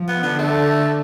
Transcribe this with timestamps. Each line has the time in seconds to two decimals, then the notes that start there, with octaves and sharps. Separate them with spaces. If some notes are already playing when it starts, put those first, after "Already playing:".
Already playing: F3
0.08 B3
0.23 D3 B3
0.39 A3